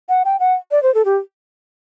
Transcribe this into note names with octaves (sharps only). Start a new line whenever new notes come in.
F#5
G5
F#5
D5
C5
A4
G4